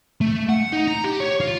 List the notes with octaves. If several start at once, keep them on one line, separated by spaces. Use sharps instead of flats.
A3
F#5
D#4
A#5
G4
C#5
F4